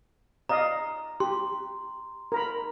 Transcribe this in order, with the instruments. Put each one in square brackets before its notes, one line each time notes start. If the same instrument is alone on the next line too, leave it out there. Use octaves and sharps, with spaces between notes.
[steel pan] D5 D#5 F5 [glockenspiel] A#5
[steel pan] G4 [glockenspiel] C6
[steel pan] A#4 A#5 B5